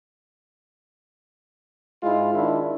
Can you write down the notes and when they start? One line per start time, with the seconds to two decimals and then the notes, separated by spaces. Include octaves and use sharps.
2.03 G#2 G#3 E4 F4
2.34 D#3 D4 E4